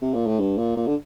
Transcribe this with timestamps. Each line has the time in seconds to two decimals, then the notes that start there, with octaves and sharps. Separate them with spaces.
0.02 C3
0.14 A#2
0.27 A2
0.39 G2
0.58 A#2
0.76 A#2
0.87 D3